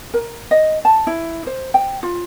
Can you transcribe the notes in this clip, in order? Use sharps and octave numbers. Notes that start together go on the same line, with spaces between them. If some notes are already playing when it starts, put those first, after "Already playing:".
A#4
D#5
A5
E4
C5
G5
F4